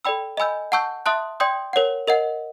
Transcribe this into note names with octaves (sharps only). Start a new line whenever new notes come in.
A4 D5 G5 B5 E6
D#5 G#5 B5 E6 G6
F#5 A5 C#6 E6 G6
E5 A5 C6 D#6 F#6
D5 G5 C6 D#6 G6
A#4 C#5 F#5
A#4 D#5 F#5